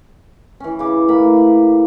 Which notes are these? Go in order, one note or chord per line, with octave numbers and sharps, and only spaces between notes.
E3 C#4
C#3 D6
A2 A#3 B5